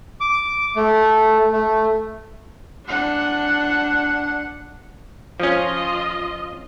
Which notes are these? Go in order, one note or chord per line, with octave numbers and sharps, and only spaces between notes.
D6
A3
A3
D4 F#5
F3 C#4 F4 D#5